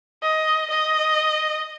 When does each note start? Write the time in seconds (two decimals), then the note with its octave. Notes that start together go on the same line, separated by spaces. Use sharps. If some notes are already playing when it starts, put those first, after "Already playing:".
0.23 D#5
0.71 D#5